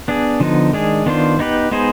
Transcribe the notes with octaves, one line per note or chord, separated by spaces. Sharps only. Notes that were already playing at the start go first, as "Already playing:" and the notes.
B3 D4 G#4
D3 F3 B3 D#4
D#3 G#3 D4 G#4
D#3 B3 D4 F4 C5
B3 D#4 G4 B4
G#3 B3 D#4 G#4 C5